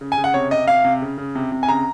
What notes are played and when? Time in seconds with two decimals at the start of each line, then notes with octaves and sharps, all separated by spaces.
0.01 C#3
0.12 G#5
0.18 C#3
0.24 F#5
0.34 C3 C#5
0.51 C3 D#5
0.67 C3 F5
0.84 C3
1.02 C#3
1.18 C#3
1.35 C3
1.52 C3
1.63 G#5
1.68 C#3 A#5